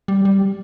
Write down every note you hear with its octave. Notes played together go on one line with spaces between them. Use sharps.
G3
G3